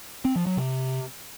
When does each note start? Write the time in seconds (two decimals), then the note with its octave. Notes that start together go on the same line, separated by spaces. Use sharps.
0.25 C4
0.36 F3
0.46 F#3
0.57 C3